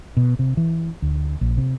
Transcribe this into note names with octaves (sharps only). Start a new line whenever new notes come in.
B2
C3
E3
D2
A#1
C3